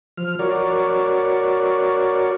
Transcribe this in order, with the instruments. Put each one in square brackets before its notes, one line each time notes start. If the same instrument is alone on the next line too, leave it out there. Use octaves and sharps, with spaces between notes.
[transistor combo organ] F3 F6
F#4 A#4 C#5 D5